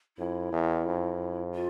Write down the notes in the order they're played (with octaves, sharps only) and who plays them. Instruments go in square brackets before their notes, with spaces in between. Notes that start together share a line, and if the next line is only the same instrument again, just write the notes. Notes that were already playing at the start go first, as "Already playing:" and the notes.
[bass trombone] F2 [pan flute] E4
[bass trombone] E2
F2
[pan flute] F4